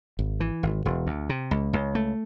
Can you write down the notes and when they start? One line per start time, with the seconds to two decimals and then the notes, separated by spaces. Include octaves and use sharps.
0.19 G#1
0.40 E3
0.63 G#1
0.85 E1
1.07 D2
1.29 C3
1.51 C#2
1.73 C#2
1.95 A3